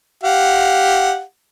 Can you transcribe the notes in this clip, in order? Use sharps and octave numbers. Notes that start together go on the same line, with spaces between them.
G4 F5 F#5